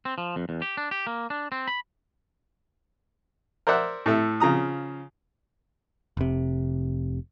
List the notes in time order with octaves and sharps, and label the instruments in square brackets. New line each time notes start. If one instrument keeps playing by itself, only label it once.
[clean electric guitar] C4
F3
F2
E2
G4
D4
G4
A#3
D4
C4
B5
[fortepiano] A#4 C5 D5 E5 F#5
A2 A4 E5 E6
C#3 F3 A#5 D#6
[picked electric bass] F1 C3